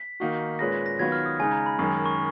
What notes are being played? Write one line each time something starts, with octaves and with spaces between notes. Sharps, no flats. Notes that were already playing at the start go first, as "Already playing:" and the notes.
Already playing: B6
D#3 A#3 D#4 F#4
A#2 G#3 C#4 G#4 B4 A#6
A#6
A#6
D#3 F#3 B3 F4 B4 G#6
F6
D#6
C#3 G#3 D#4 G#5
A#5
B5
F#2 D#3 G#3 C#6
C#6